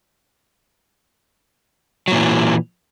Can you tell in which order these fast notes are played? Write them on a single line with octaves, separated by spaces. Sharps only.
F#3 A#2 E3